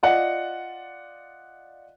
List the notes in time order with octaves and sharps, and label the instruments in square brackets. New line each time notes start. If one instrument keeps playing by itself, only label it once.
[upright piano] F4 D5 D#5 F#5